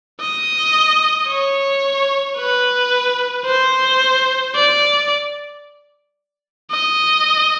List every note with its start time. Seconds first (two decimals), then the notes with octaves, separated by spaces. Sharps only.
0.21 D#5
1.29 C#5
2.37 B4
3.46 C5
4.55 D5
6.71 D#5